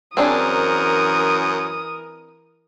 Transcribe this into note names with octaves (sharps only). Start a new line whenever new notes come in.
F#2 E3 C4 D4 G#4 A#4 D#6